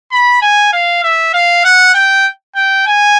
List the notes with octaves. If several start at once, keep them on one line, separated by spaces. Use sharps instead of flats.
B5
G#5
F5
E5
F5
F#5
G5
G5
G#5